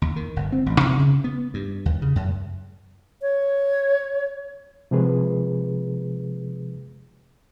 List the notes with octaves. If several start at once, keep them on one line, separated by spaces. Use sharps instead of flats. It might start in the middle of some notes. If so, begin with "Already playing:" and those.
D#2
D#3
G1
C4
A1
C3
C#3
B3
G2
D#2
C#3
F#2
C#5
C3 F3 G#3 G#4 B4